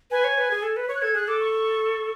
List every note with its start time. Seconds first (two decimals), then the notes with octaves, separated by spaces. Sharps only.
0.11 B4 G#5
0.24 C#5
0.38 B4
0.51 G#4
0.62 A4
0.77 B4
0.89 C#5 C#6
0.95 F#6
1.01 A4 G#6
1.15 G#4 F#6
1.28 A4 D6
1.40 C#6
1.53 C#6